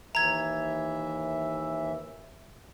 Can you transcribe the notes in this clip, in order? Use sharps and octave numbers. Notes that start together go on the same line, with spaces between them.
D#2 E3 E5 A#5 G#6